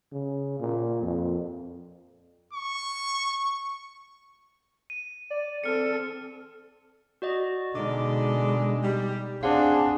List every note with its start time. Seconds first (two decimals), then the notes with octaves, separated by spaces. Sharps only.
0.12 C#3
0.60 A#2
1.02 F2
2.53 C#6
4.90 D#7
5.30 D5
5.64 C4 A4 F6 C#7
7.22 F#4 D5 D#5
7.75 B2 D3 G#3 D#4 D5 D#5 D6
8.83 G3
9.43 C4 D4 G#4 F5 F#5 C6